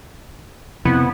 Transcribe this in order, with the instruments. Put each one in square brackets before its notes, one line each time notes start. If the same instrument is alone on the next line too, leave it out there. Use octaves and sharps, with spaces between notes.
[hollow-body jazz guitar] F2 [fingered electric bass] C3 [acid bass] B3 [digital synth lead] E4